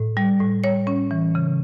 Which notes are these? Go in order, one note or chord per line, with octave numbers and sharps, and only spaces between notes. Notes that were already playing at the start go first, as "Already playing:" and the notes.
Already playing: A2
G3
A2
G3 C#5
C#4
E3
C#3